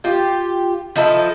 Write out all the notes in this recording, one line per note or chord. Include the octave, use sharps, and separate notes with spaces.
F4 G4
F3 D#4 E4 A4